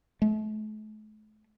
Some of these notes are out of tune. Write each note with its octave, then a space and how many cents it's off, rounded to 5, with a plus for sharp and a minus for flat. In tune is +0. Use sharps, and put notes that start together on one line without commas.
A3 -40